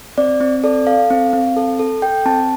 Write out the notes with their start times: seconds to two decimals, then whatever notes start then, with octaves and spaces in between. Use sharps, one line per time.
0.18 C4 D5
0.40 C4
0.64 A4 D5
0.87 A4 F5
1.10 C4
1.33 C4
1.57 A4
1.79 A4
2.02 A4 G5
2.25 C4 A5